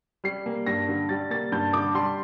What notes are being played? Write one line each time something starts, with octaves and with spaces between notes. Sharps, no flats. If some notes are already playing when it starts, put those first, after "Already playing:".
G3 C7
A#3
G2 A#6
D3
G3 A6
A#3 A6
G2 G6
D3 D6
G3 C6